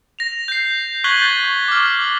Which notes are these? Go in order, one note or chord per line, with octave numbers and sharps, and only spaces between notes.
A#6 F7
G6 C7
C#6 F#6 G#6 B6 F#7 G7
G6 A6
C#6
D6 F6